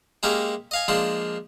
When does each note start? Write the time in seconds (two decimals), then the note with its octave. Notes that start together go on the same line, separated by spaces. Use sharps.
0.23 G#3 A#3 C#4 G4 A#4 E5
0.71 D#5 F5 G#5
0.88 F3 G#3 A#3 D4 C6